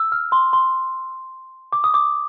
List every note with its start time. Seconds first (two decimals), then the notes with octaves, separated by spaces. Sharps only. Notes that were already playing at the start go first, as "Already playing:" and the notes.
Already playing: E6
0.12 F6
0.32 C6
0.53 C6
1.73 D6
1.84 D#6
1.94 D6